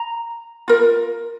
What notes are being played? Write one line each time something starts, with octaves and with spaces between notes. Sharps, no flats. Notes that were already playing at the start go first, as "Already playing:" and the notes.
Already playing: A#5
F4 A#4